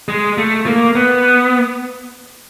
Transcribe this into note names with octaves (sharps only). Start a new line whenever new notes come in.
G#3
A3
A#3
B3